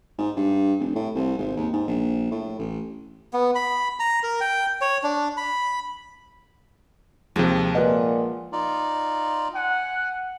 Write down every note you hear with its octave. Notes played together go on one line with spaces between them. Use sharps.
G#2
G2
F1
A2
C2
G#1
D#2
G#2
A#1
A2
A1
B3
B5
A#5
A#4
G5
C#5
D4
B5
D#2 C3 F3 G#3
A#2 F4 B4 D#5 F#5
D#4 F4 D5
F#5 G#5